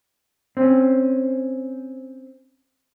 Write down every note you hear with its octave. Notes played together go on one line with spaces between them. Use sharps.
C4 C#4